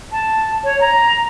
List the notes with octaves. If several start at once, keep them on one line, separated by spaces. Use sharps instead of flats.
A5
C#5
A#5